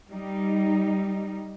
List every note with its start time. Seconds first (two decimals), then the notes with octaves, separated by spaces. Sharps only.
0.10 G3 D#4